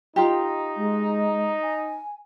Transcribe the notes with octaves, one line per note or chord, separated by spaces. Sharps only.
D#4 F4 G4
G#3
G#5